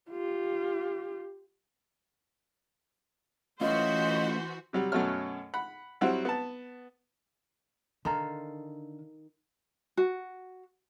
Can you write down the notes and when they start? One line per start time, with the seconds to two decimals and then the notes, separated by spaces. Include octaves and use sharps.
0.10 F4 G4
3.61 E3 A3 C#4 F4 F#4 C5 D#5
4.73 C3 F#3 G3
4.92 F#2 B2 F#3 A3 C#5 F6
5.54 F#5 B5
6.01 F#3 G3 C4 E4 F#4
6.25 B3 A5
8.05 D3 D#3 A4 F5 A#5 C6
9.97 F#4